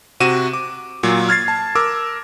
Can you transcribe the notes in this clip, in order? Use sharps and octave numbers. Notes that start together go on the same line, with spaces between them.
C3 F#4 D#7 E7
D6
A#2 F#3
F6 G#6 A6 C7
A5
A#4 D6 E6